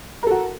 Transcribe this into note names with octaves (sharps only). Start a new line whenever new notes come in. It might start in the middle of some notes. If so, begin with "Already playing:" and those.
F#4 A4 A#4